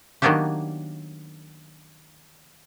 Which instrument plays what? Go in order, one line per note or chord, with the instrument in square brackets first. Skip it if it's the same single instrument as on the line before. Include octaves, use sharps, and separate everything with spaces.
[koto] D#3 F#3 A#3 B3 D4 G4